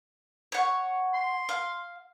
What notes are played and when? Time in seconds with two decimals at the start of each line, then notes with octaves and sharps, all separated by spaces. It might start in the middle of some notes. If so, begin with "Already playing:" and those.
0.52 C#5 F#5
1.14 C6
1.49 F5